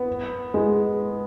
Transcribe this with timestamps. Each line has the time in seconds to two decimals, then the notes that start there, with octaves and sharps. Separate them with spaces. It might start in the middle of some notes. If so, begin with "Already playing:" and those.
Already playing: B3
0.54 G#3